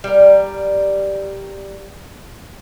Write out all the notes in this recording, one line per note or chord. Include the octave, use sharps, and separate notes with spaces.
G3 A#4